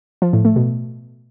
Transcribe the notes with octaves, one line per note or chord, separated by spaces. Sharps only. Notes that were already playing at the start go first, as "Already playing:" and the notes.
F3
A2
A3
B2